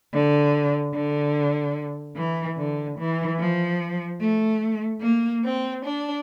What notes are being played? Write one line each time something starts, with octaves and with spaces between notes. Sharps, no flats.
D3
D3
E3
D3
E3
F3
A3
A#3
C4
D4